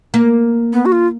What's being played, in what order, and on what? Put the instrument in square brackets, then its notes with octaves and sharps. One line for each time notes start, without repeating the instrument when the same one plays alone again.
[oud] A#3
[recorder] B3
F#4
F4